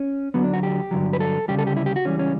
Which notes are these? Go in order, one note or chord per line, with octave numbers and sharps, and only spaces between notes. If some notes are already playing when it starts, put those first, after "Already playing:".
Already playing: C#4
D2 D3 F#3 B3
D4
F#4
G4
G2 D3 F#3
B4
A4
D2 C#3 G3 G4
A4
G4
E4
G4
F#4
C#2 C#3 E3 G3 C#4
C#4